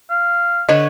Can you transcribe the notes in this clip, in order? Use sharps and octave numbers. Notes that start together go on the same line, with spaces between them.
F5
D3 B4 C#5 D#5